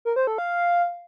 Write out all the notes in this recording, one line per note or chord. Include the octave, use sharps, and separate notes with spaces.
A#4
C5
A4
F5